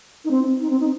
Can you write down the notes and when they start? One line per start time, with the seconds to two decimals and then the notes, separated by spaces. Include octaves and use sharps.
0.24 D#4
0.31 C4
0.61 D#4
0.70 C4
0.80 D#4